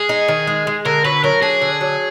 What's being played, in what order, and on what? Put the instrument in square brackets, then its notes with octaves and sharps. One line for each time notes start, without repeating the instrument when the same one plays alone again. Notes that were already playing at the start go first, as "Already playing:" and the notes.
Already playing: [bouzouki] G#3 [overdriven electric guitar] G#4
[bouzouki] D#4
D#3
G#3
G#3
[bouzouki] D3 [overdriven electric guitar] A#4
[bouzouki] F#3 [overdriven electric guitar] B4
[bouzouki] F#3 [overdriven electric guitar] A#4
[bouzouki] D4 [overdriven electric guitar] G#4
[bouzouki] D3
F#3